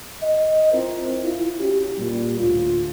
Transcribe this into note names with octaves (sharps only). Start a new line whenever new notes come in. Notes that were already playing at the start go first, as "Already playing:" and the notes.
D#5
C4 E4 F4 A#4 C5
E4 F4
C#4 E4 F#4 G4
A#2 G3
D2 A2 F4